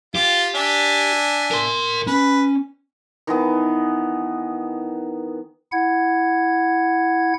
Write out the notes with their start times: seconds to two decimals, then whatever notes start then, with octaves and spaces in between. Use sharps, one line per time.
0.15 F4 G4
0.55 D4 E5 G#5
1.51 A#4 C6
2.07 C#4 B4
3.27 D#3 E3 B3 D#4
5.72 E4 F#5 G#6